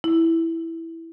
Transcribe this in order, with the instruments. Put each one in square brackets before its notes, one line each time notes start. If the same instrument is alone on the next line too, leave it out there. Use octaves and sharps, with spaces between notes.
[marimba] E4